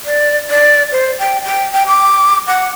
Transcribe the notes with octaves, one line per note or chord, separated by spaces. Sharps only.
D5
D5
C5
G5
G5
G5
D6
F#5